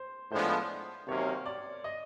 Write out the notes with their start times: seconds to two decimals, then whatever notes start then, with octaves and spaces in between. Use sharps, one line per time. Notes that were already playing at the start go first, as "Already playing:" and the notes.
Already playing: C5
0.31 A2 F3 G#3 B3 D4 C5
1.08 C3 D#3 F#3 A#3 C#4 C#5
1.46 D5
1.84 D#5